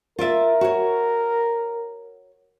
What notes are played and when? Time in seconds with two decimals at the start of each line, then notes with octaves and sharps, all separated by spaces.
0.19 F4 A#4 D5 E5
0.61 F#4 C#5